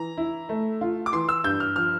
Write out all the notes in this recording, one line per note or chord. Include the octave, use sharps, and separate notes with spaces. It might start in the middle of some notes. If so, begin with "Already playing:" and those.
Already playing: E3 A#5
E4
A3
F4
D6
E3 C6
E6
G2 G6
F6
F3 F6